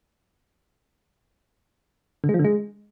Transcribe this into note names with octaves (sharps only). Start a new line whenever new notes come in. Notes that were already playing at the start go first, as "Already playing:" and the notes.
D3
G#3
F3
D3
G#3